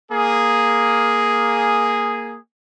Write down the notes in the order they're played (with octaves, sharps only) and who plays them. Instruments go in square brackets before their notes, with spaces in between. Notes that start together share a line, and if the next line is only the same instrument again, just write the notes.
[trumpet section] A#3 G#4